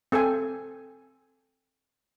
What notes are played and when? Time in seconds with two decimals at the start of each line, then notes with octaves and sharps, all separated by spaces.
0.12 C4 A4 C5 G#5